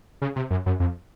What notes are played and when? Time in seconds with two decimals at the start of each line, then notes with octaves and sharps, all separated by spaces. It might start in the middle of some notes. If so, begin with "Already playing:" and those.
0.22 C#3
0.36 C3
0.50 F#2
0.66 F#2
0.80 F2